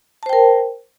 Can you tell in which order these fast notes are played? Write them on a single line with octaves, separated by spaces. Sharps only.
A5 C5 G5 A#4